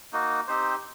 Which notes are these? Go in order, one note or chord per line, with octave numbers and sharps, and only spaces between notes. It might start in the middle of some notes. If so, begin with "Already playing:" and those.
A#3 D#4 F#4
C4 D#4 G4 C5